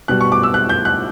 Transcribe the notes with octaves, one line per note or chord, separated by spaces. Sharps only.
B2 G3 F#6
C#6
D6
E6
F#6
G6
F#6